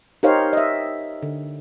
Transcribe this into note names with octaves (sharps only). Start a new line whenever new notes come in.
D#4 G4 A#4 C5 C#5 F5
D#5 E5
D3